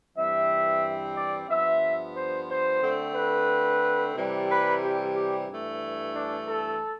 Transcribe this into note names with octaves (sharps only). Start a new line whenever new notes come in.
G2 E3 G3 C4 E5
D5
G2 F3 B3 E5
C5
C5
D3 A3 C4
B4
C3 E3 G3
B4
G4
G4
G2 E3 A3
D4
A4